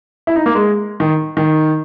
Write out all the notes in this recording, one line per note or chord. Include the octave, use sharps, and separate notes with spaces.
E4
D#4
A#3
G#3
D#3
D#3